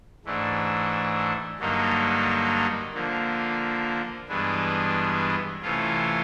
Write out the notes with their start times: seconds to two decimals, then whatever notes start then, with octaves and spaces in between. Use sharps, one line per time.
0.25 G#2 E3 A3 D4
1.59 G2 D3 F#3 A#3 D#4
2.94 D3 F3 A#3
4.28 G2 E3 G#3 B3 D4
5.62 C3 E3 A3 C#4 F4